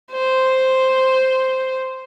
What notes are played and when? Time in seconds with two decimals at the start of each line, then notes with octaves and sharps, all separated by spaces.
0.11 C5